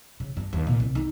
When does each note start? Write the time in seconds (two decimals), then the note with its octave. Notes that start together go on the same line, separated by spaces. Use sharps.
0.20 C#3
0.37 G2
0.53 D#2
0.67 C2 A#2
0.80 C2 C4
0.95 D3 D#4